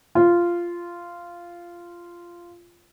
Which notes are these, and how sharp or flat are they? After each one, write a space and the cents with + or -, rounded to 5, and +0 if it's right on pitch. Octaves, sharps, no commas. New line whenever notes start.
F4 -10